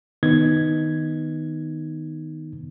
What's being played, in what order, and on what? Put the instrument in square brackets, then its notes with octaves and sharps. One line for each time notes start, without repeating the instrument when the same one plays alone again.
[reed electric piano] D#3 B3 D#4 G#6